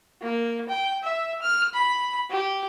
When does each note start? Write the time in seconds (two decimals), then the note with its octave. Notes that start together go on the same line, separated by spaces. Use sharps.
0.22 A#3
0.69 G5
1.03 E5
1.42 F6
1.74 B5
2.31 G4